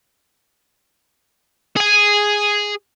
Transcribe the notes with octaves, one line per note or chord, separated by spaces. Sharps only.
G#4 G#5